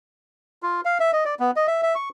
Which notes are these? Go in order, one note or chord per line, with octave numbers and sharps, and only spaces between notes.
F4
F5
E5
D#5
D5
B3
D#5
E5
E5
C#6